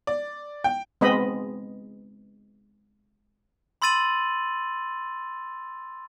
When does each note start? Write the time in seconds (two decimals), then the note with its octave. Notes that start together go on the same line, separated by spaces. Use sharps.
0.07 D5
0.64 G5
1.01 G#3 B3 C4 D#5 B5
3.82 B5 C6 E6 A6 D#7 F#7